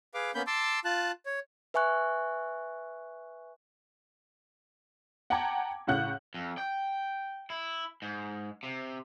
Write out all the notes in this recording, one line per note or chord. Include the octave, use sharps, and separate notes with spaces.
G#4 B4 F5 D6
A#3 B3 C#4 B5 G6
A5 C6 D6 E6
F4 A5 F#6
C#5
B4 E5 G#5 C#6 F#6
F#5 G5 A5 A#5 D6 G#6
A2 C#3 F#5 F#6 G6
F2
G5
E4
G#2
C3